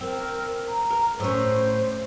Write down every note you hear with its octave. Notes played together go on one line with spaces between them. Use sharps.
C4 A#4
A#5
A#4
A2 C#4 C5